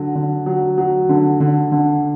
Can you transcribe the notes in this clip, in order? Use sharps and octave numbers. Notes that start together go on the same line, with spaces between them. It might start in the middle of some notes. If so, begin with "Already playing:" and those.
Already playing: D3 F#3
D3
F#3
F#3
D3
D3
D3